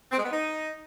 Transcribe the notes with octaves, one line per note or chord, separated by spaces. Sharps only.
C4
G#3
B3
D#4